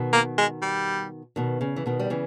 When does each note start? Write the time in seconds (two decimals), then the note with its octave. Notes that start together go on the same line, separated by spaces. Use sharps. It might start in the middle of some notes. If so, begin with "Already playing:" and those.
Already playing: B2 D#3
0.13 A#3
0.38 G#3
0.62 G3
1.36 B2 D#3
1.61 C#3
1.76 E3
1.86 B2 D#3
2.00 G3
2.10 C#3 E3